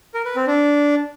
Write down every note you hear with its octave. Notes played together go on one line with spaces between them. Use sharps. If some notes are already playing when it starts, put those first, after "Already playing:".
A#4
B4
C4
D4